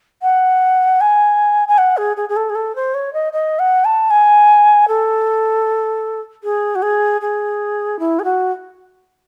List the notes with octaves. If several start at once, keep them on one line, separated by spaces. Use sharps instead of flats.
F#5
G#5
G#5
F#5
G#4
G#4
G#4
A4
G#4
A4
C5
C#5
D#5
D#5
F#5
A5
G#5
A4
G#4
F#4
G#4
G#4
E4
G#4
F#4